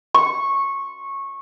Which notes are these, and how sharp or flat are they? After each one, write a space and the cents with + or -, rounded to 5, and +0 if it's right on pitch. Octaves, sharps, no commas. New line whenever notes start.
C#6 -15